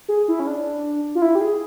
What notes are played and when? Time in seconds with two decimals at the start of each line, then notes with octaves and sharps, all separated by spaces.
0.08 G#4
0.28 E4
0.40 C#4
0.47 D4
1.15 F4
1.22 E4
1.35 G4
1.41 G#4